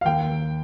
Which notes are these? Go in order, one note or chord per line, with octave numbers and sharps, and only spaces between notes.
F5
D#2 G5
D#2